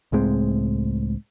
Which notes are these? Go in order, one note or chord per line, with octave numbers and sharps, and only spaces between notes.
C#2 A2 G#3 C4